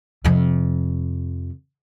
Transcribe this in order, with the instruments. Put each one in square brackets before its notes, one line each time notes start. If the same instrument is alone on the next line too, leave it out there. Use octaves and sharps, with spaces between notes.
[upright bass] F2 C3